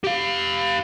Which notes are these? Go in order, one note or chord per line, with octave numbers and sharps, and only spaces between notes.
G4 F5